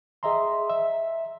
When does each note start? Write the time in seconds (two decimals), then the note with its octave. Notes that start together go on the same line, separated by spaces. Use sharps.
0.23 G#4 D#5 E5 A#5 C6
0.70 E5